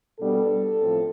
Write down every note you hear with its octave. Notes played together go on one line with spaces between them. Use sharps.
B2 G3 B3 D4 A4
A2 F3 C4